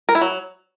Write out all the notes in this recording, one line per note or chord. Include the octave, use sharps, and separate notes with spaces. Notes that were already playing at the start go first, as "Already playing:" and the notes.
A#4
E4
F#3